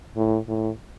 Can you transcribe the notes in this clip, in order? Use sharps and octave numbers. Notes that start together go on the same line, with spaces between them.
A2
A2